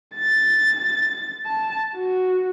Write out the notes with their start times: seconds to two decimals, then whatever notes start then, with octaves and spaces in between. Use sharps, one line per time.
0.16 A6
1.46 A5
1.95 F#4